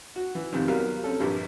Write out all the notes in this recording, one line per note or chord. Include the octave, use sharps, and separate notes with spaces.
F#4
E3
F2 C3 D#3
F#3 G3 B3 A#4 F5
C4 C#4 A4
A#1 G2 G3